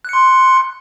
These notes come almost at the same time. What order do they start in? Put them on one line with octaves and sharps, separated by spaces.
F#6 C#7 C6